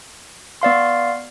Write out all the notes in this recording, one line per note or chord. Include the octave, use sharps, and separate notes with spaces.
B3 D5 F5 C6